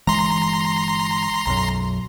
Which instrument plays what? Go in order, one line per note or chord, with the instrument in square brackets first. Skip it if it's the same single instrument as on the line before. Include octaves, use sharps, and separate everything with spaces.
[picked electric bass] G1 E3 G#3 [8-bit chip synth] A#5 C6
[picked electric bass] B1 F#2